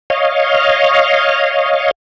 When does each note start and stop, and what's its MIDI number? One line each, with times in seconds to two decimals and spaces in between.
0.10 1.91 73
0.10 1.91 75
0.10 1.91 77